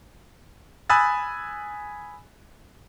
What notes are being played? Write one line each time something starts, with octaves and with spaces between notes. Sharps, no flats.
G#5 B5 D#6 E6 F#6 A6